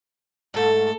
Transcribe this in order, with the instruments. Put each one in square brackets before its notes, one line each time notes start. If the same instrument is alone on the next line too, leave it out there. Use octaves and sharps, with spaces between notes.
[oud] G#2 A3 [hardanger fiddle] A4